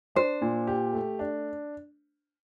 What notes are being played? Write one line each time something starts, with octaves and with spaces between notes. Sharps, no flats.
D4 C5
A#2
G4
A3
D4